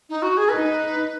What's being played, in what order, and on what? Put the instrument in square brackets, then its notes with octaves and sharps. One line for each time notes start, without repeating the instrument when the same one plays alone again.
[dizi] D#4
F#4
G#4
[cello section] D#4 [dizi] B4